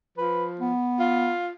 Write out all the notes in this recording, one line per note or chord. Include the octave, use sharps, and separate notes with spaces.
F3 B4
B3
F4